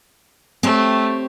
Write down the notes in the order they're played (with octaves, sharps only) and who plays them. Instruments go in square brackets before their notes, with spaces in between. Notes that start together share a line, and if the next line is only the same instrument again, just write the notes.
[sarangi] A3 [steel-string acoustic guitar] C4 G4 C#5